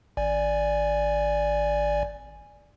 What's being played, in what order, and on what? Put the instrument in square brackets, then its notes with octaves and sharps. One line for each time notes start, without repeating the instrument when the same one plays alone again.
[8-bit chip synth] G#1 D5 G#5